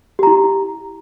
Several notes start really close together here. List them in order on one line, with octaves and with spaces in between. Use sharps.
G4 A#5 E4